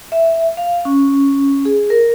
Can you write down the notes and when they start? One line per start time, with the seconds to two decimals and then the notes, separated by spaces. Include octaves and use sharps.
0.12 E5
0.57 F5
0.85 C#4
1.65 G#4
1.90 A#4